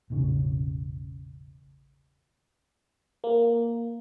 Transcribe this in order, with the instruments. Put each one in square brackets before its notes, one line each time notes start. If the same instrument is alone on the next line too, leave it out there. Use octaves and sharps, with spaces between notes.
[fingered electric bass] E1 A1 C#3 C#4
[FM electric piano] A#3